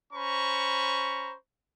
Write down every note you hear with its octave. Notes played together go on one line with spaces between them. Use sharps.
C#4 C5 A#5 B5 C#6